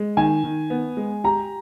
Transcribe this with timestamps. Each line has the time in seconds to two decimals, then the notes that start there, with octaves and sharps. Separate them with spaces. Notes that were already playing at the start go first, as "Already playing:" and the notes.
Already playing: G#3
0.17 D#3 G#5
0.44 D#3
0.70 B3
0.97 G#3
1.24 G4 A#5